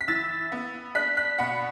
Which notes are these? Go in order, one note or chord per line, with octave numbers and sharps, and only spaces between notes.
B6
E3 E6 A6
B3
D4 F#6 B6
F#6 B6
B2 F#5 B5